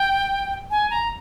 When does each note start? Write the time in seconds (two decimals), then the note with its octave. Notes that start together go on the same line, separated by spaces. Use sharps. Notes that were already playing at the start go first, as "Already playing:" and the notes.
Already playing: G5
0.71 G#5
0.90 A#5